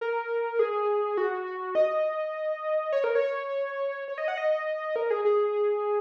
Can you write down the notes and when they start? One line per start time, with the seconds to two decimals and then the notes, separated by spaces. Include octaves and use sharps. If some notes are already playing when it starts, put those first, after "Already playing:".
0.01 A#4
0.59 G#4
1.17 F#4
1.75 D#5
2.92 C#5
3.04 A#4
3.15 C#5
4.08 C#5
4.18 D#5
4.28 F#5
4.37 D#5
4.96 A#4
5.10 G#4
5.25 G#4